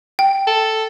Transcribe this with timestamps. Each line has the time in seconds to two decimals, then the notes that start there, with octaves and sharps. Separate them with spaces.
0.19 G5
0.47 A4